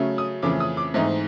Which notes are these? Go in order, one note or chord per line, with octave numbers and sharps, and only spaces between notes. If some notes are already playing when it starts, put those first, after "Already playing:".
Already playing: C#3 F#3 A3 C#4
D#6
F2 C#3 E3 A3 D6
D#6
D6
G#2 E3 A3 C4 D#4